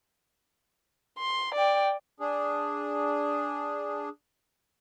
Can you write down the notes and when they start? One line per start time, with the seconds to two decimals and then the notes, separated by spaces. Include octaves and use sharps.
1.19 C6
1.54 D5 G5
2.20 D4 G#4